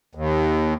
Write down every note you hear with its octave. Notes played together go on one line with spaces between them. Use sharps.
D#2